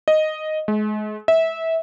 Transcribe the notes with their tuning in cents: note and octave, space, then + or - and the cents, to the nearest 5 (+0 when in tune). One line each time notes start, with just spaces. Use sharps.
D#5 -5
G#3 +35
E5 -20